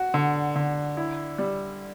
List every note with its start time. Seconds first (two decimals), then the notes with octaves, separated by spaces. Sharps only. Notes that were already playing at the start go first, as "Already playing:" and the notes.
Already playing: F#4
0.14 D3
0.56 D3
0.97 E4
1.38 G3